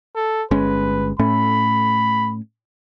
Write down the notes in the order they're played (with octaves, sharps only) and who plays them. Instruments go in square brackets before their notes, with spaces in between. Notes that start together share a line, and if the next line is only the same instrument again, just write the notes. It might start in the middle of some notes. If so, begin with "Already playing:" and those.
[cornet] A4
[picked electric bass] G1 G#3 C#4 [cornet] B4
[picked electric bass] A2 A3 C#4 [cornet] B5